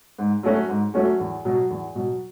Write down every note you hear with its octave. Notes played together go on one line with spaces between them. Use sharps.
G#2
F#3 A3 C#4 F#4
G#2
F#3 A3 C#4 F#4
E2
B2 F#3
E2
B2 F#3